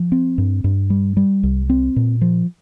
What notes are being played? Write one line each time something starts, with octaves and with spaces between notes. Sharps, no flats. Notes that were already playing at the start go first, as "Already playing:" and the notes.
Already playing: F3
C4
G2
G2
G3
G3
C2
C4
A#2
F3